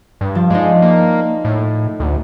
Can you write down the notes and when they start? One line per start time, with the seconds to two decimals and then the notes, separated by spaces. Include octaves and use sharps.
0.21 G2
0.35 F3 A5
0.50 G#3 D#4 C5 D5
0.82 A#3
1.45 A2
2.00 D2